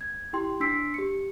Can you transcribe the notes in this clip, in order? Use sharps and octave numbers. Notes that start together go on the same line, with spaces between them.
G#6
E4 G4 G5 C6
D4 C6 E6 B6 C7 D7
G4 C#7